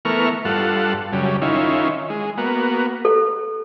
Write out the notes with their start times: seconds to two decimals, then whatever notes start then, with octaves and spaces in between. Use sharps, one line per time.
0.05 E3 A3 B3 A#4 C#6 F6
0.45 G2 F4 A4 F#5
1.13 F#2 C#3 G3
1.42 D#3 C#4 E4 F4
2.10 G#3
2.38 A#3 B3 F#4
3.05 A4